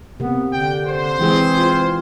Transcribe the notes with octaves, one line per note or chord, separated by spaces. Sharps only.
C3 A#3 B3
D3 G5
C5
E3 G#3 C4 G#4
F4